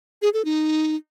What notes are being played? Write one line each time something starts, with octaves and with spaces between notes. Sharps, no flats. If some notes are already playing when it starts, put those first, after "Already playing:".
G#4
A4
D#4